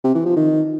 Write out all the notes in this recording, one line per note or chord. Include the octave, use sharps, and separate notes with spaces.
C3
E3
F3
D#3